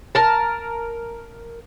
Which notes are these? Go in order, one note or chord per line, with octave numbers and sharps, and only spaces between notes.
A#4 A5